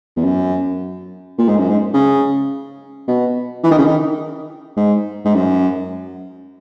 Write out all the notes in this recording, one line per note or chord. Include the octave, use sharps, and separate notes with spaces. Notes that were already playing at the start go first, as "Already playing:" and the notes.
E2
F#2
A#2
G#2
F#2
G#2
C#3
B2
E3
D#3
C#3
D#3
G#2
G#2
F#2